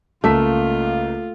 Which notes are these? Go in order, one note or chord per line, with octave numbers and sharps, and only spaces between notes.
C#2 A3 A#3 F4 B6